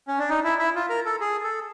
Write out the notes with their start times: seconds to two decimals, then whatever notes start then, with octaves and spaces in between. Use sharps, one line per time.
0.08 C#4
0.19 D4
0.29 D#4
0.44 E4
0.59 E4
0.75 F4
0.89 A#4
1.05 A4
1.21 G#4
1.44 A4